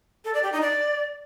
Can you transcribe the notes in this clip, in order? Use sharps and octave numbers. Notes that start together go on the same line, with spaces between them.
A4
D5
G4
D#4
D5